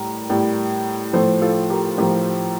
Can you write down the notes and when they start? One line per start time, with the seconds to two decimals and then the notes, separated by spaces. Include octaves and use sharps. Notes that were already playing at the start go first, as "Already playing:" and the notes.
Already playing: A2 G3 A#4
0.30 A2 G3
1.13 A2 F3 A4 C5
1.42 F4 A4
1.70 G4 A#4
1.98 A2 F3 G4 A#4